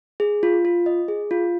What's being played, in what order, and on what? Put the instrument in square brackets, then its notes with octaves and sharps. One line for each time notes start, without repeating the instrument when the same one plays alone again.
[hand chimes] G#4
F4
F4
D#5
G#4
F4